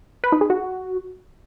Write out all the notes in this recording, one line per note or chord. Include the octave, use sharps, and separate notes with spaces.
B4
D#4
G#4
F#4